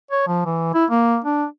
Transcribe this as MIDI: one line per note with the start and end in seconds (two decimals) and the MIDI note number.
0.11 0.23 73
0.27 0.42 53
0.45 0.70 52
0.74 0.85 64
0.90 1.18 58
1.24 1.45 62